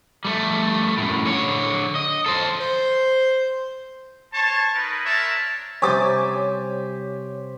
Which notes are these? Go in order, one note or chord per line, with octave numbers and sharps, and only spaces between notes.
G3 A3
F#2 A2
D3 C#5
D#5
A4 C5
C5
C5 C#5 A5
D#4 A#4 B4
D4 A#4 C5 C#5 E5 A5
C3 G3 G4 C5 C#5 G#5 D6 A6